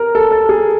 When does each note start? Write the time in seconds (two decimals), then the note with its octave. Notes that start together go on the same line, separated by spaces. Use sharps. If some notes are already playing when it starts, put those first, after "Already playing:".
Already playing: A#4
0.15 A4
0.32 A4
0.49 G#4